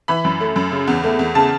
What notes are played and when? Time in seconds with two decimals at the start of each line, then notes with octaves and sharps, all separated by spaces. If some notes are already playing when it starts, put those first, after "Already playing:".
0.08 E3 B5
0.25 F#2
0.41 A3
0.56 F#2
0.72 C#3
0.88 E2
1.04 A3
1.19 E2
1.35 C#3 A5